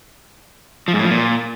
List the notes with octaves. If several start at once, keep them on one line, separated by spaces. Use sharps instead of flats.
F3
G#2
A2
F3
A#2